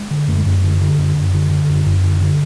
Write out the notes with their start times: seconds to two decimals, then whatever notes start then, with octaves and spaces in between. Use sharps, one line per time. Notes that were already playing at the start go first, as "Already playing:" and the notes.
Already playing: G#3
0.11 D3
0.28 F#2 A3
0.38 G#3
0.46 F#2 A3
0.64 D3
0.81 D3
0.99 F#2
1.16 F#2
1.34 D3
1.51 D3
1.69 F#2
1.86 F#2
2.04 D3
2.21 D3